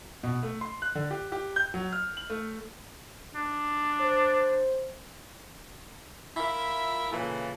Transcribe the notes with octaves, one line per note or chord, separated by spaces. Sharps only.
B2
A3
C6
F#6
D3
G4
G4
G6
F#3
F6
F#7
A3
D4
C5
E4 F4 A#4 E5
A#2 C#3 E3 F4 A4